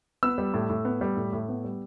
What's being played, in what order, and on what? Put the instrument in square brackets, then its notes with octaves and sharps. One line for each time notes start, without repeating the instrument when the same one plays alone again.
[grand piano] B3 E6
G3
A2
A2
B3
G3
A2
A2
B3
G3